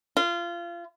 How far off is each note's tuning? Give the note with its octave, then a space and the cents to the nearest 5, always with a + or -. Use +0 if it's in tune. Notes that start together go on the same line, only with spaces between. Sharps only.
F4 -25